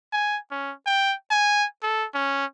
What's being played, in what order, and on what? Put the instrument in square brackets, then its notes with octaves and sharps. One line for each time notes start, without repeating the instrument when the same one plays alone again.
[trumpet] G#5
C#4
G5
G#5
A4
C#4